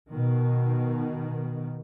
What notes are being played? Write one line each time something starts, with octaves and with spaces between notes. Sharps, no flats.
B2 D#3